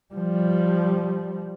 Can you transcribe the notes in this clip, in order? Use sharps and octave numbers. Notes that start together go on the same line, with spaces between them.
F3 G3